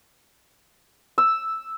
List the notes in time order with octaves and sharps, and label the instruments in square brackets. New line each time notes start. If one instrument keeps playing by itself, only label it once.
[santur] E6